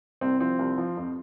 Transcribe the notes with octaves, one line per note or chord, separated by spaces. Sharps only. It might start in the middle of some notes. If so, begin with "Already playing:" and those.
C2 C4
F3 C4
C2
F3
F2